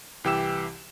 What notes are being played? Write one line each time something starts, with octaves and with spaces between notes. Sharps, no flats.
C2 E3 G4 G5 E6 E7